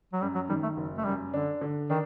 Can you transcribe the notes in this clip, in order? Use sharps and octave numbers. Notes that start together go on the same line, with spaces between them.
F#3
F#2 G3
F#3
D#3 G3
A3
F#1
A3
F#2 G3
D3 D4
D3
D#3 D4